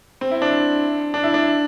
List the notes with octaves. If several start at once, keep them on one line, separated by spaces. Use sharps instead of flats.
C4
E4
D4
D4
E4
D4